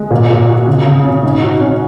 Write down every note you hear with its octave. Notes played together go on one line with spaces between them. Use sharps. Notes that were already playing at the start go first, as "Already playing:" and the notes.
Already playing: G#3
A#2
A#2
F#4
C#3
C#3
C#4
G#2
F#4
C#4